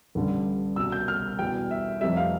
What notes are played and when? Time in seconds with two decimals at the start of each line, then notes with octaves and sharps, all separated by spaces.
0.15 A1 G2 D3 G3
0.76 C2 B2 G3 E6
0.92 G6
1.08 F6
1.39 E2 B2 G3 G5
1.71 E5
2.01 F1 F2 C3 G3 E5
2.17 F5